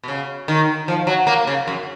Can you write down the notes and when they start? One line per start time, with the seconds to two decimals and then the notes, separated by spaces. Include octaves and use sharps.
0.03 B2
0.08 C#3
0.48 D#3
0.88 F3
1.07 F#3
1.27 A#3
1.47 C#3
1.68 F#2